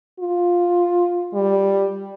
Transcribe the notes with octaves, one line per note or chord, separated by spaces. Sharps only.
F4
G3